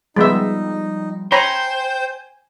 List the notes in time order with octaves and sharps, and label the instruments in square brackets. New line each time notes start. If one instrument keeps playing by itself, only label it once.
[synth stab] F3 G3 [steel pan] G#3 B3 E5 [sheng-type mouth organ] D#4
[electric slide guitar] C5 [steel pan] C#5 A#5 B5 [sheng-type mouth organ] G5 G6 [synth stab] G#5